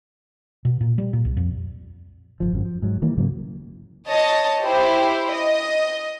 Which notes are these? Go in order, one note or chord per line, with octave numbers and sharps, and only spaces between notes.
B2
A#2
G3
A#2
C2
F2
G1 C2 F3
G#1 F#2
F3
G#2 F#3
D#3 E3 G3 A#3
G#2 C#3 F#3 A#3
C#5 D#5 A5
E4 G4 C5
D#5